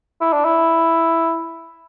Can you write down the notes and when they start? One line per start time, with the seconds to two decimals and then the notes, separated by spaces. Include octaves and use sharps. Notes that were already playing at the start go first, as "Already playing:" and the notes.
0.21 E4
0.33 D4
0.45 E4